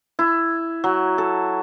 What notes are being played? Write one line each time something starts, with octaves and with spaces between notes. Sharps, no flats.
E4
F#3
A4